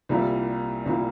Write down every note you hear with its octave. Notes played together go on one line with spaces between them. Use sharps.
C2 A#2 G3 A#3 E4
C2 A#2 G3 A#3 E4